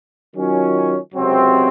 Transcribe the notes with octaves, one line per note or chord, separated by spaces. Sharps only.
D#3 F#3 C#4 F4
C#2 C3 F#3 C4